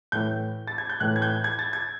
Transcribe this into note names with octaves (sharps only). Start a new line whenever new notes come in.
A2 E3 G6
A6
G#6
G6
A2 E3 F#6
G#6
G6
G#6
A6
G#6